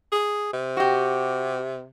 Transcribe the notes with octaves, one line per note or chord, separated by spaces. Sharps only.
G#4
C3
F#4 G4